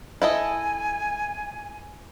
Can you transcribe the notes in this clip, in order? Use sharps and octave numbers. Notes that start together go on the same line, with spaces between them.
E4 A4 D#5 G#5